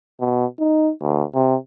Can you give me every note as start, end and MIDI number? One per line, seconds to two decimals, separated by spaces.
0.20 0.46 47
0.59 0.92 63
1.01 1.23 38
1.34 1.56 48